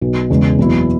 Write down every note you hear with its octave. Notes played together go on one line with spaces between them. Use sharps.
B1 B2 F#3
E2 C#3 G#3
F#1 E2 B2 F#3 E4